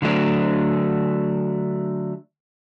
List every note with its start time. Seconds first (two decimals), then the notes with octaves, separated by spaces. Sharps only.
0.02 D3 F#3 A3 D4